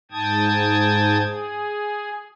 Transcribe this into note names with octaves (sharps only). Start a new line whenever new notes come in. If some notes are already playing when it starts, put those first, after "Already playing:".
G#2 G5 A5 D#6 G#6
G#4